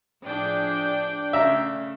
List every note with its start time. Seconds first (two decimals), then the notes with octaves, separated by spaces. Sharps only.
0.25 A2 F3 D4 G#4 G5
1.33 C#3 A3 E5 A#5